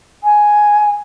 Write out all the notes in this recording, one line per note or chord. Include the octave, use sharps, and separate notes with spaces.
G#5